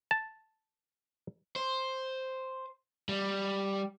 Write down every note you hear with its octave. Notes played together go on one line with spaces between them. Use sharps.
A5
C5
G3